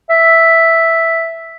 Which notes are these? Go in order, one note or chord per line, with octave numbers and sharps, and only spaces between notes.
E5